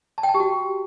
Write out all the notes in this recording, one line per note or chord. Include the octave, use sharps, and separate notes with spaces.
A5
G5
A5
G4
F#4